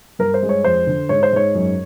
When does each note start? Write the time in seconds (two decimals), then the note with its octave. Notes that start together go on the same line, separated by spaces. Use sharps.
0.19 G2 A#4
0.34 C5
0.43 G#3
0.49 C#5
0.64 F2 C5
0.87 D3
1.09 G#2 C#5
1.23 C5
1.33 G#2 C#5
1.55 F#2